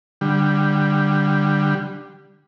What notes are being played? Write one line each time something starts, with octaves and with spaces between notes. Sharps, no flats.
D3 G3